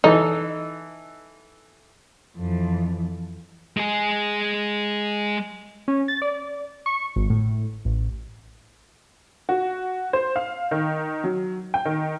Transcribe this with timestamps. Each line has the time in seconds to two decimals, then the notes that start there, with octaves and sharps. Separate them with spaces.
0.04 E3 D#4 A4
2.38 F2 E3
3.77 G#3 G#4
5.88 C#4
6.08 A6
6.22 D5
6.86 C#6
7.16 G#1
7.30 A2
7.85 A1
9.49 F#4
10.13 C5
10.36 F5
10.71 D#3
11.24 F#3
11.74 G5
11.85 D#3